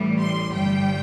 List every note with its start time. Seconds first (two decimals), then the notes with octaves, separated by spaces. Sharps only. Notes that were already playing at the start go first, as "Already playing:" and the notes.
Already playing: A1 A2 E3 G3
0.19 C6
0.53 G1 G2 G3 G5